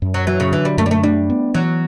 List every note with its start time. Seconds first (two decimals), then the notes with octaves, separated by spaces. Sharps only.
0.02 F#2
0.14 F#3
0.27 E3 F#3
0.40 C#3
0.52 D3 E3
0.65 G3
0.77 F#2 A3
0.86 G3
0.91 A3
1.03 G3 D4
1.30 B3
1.54 E3 F#3